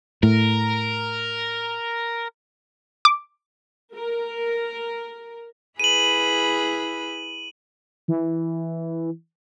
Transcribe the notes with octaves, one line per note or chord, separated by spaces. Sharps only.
A2 A#4
D6
A#4
E4 G#4 B4 D#7 F#7
E3